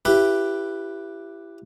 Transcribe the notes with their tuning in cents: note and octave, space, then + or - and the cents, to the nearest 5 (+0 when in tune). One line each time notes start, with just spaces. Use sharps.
E4 +25 G4 +0 B4 +0